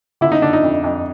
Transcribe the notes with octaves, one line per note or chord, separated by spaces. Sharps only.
D3 E4
D#4
D3 D4
D#4
F2
F2